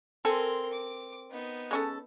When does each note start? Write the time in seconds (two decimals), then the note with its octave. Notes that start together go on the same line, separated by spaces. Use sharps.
0.25 C4 A4 A#4 G#5 C6
0.73 D6
1.30 B3 D#4
1.71 G#3 C#4 A4